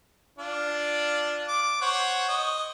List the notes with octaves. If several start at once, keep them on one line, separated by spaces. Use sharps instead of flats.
D4 F4
D6
C5 C#5 F#5
D#5